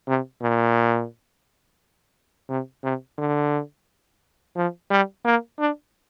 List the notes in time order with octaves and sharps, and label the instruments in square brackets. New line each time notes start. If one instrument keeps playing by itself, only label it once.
[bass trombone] C3
A#2
C3
C3
D3
F3
G3
A#3
D4